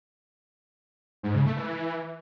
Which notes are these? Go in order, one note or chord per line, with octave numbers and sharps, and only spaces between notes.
G#2
C#3
A3
E3